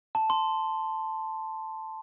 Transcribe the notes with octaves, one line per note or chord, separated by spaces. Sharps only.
A5
C6